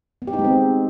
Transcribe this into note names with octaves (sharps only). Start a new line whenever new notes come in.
B3
G4
D#4
G#3
C4